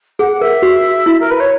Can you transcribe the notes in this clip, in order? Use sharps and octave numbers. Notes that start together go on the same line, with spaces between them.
G#4 F#5
F#5
A#4 E5
F#4
E4
A#4
B4
C#5